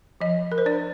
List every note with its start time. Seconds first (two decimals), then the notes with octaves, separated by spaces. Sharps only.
0.21 F3 D#5
0.52 A#4
0.58 C5
0.66 D4 D5